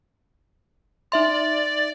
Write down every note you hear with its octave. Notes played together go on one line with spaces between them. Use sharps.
D#4 D5 E5 C6